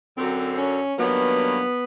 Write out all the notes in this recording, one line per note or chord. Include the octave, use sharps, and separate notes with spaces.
F#2 D3 F#3 C4
C#4
G2 D#3 F#3 A#3 B3